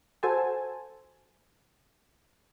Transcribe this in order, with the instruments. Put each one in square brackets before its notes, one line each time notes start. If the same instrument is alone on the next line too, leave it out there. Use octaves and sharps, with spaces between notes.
[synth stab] F#4 A4 C5 G#5 A5